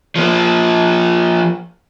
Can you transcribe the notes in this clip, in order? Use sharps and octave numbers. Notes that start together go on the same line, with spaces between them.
F3 A#3